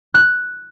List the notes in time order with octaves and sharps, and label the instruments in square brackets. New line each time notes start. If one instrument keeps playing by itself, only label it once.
[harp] F#6